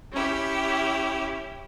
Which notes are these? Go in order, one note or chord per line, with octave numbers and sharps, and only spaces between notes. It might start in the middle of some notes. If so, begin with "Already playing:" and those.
C#4 E4 G4